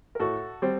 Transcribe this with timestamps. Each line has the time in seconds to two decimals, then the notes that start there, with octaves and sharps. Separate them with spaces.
0.15 A#4
0.20 A2 F#4 A4
0.62 G3 C4